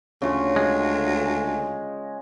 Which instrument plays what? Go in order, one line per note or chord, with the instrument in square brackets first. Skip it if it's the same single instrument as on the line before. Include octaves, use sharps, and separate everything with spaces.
[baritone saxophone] D2 [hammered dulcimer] C#3 F4
[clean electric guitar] G#3